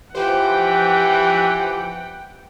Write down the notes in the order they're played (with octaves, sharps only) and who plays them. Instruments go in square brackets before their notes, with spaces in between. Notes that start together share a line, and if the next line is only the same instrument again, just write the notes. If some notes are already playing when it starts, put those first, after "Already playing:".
[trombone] E3 [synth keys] F3 B4 C5 [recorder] G4 [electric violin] F#5 G5